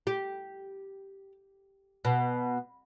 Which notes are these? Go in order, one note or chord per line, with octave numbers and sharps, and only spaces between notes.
G4
B2